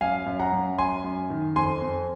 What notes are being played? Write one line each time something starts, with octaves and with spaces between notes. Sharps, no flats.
F#2 F5 G#5
F#2
F#5 A#5
F#2
F#2 G#5 C6
F#2
D#3
F2 G#5 C6
F2